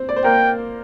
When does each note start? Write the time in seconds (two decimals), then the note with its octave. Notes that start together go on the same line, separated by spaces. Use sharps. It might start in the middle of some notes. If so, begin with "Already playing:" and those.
Already playing: C4 C5
0.09 D5
0.16 C5
0.24 A#3 A#4 G5